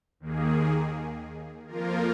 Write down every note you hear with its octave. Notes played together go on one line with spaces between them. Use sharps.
D#2 D#3 A#3 G#4
F2 F3 A#3 F4 A#4